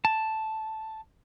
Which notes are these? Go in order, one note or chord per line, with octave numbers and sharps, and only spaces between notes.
A5